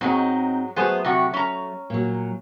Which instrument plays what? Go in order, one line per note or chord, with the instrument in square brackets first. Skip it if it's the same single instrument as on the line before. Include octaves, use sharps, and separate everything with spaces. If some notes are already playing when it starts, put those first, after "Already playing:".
[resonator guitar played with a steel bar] G#2 F#3 G#3 [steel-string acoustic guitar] C4 C#4 D#4
[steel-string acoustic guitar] F#3 A3 [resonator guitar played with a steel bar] B3 G#4 C5
[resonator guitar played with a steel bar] C3 F#4 G4
C#4 A#5
[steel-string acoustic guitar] A#2 F#3